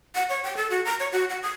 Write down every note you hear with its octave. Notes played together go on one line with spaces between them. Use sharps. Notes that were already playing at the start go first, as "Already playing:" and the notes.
F#5
C#5
G5
A4
F#4
A#5
C#5
F#4
F#5
D#6